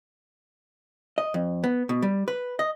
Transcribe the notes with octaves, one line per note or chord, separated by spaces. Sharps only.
D#5
F2
B3
B2
G3
B4
D#5